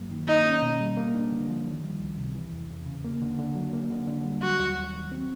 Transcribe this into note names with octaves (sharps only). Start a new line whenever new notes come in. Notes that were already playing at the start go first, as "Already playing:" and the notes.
Already playing: G2 F#3 A#3
D#3
A#3 D#4
C#4
B2
G3
A#3
D4
D3
F3
D#3
G3
C#2
C3
E3
E2
E2
C#3
A#3
D3
D3
F#3
A#3
D3
D3
G3
F#3 F#4
D#2
D#2
D#3
C4